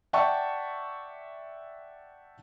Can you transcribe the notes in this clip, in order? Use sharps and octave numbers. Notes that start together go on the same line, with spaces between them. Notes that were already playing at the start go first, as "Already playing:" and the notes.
D5 E5 F#5 G5 A5 C#6